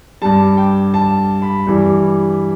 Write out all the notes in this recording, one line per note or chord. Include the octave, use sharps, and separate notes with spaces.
G2 G3 A5
G5
A5
B5
G2 E3 G3